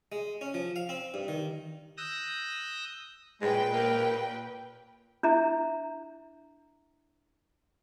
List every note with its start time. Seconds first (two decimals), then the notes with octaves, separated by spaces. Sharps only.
0.12 G#3
0.41 C#4
0.54 F3
0.76 F5
0.89 C4
1.14 G2
1.28 D#3
1.97 D#6 E6 F#6 G6 A#6
3.41 A#2 G#3 B4 G5
3.73 A#3
5.23 D4 E4 E5 A#5